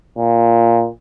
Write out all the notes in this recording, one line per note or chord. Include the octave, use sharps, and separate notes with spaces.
A#2